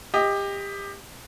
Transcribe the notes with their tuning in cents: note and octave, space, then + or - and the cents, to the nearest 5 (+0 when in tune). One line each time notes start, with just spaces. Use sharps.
G4 +25 D#5 +10